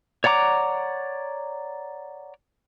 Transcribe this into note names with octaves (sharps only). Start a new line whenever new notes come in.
C#5 D5 F#5 A#5 D6